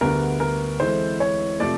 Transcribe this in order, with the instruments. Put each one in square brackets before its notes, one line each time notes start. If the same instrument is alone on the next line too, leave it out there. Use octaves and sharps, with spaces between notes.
[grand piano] D2 D3 G3 B3 [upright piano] A#4
[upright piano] A#4
[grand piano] E3 G#3 C4 E4 A4 [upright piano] C5
[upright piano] C#5
[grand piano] C3 F3 A3 C4 [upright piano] D5